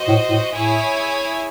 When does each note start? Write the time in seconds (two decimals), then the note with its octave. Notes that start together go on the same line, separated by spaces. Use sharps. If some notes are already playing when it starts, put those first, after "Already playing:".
Already playing: F#4 C5 D#5
0.08 A2
0.30 A2
0.52 A2 E4 G#4 C#5 G#5